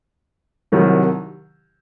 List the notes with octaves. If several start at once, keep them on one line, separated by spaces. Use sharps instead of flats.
C2 C3 D#3 F#3